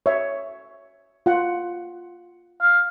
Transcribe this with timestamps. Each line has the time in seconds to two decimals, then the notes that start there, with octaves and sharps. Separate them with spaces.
0.06 C#5 E5
1.26 F4 F#5
2.62 F5